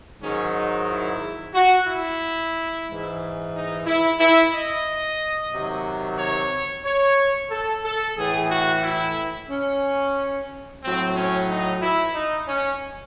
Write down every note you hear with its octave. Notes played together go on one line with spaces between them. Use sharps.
G#2 D#3 F#3 C#4
D#4
E4
F#4
E4
G#2 E3
D#4
E4
E4
D#5
C3 D#3 F#3
C#5
C#5
A4
A4
A2 E3 G#4
F#4
E4
C#4
A2 F#3 C4
C#4
D#4
E4
D#4
C#4